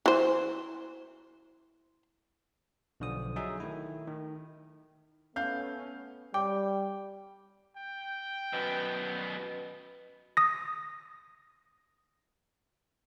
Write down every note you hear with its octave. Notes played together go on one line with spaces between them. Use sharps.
E3 C5
B1 D3 F3 D#6
F#3 D#4 G#4 E5
D#3 A3 E4
D#3
A3 B3 C#4 F5 G6
G3 G5 D6
G5
F#2 B2 B3
D#6 A#6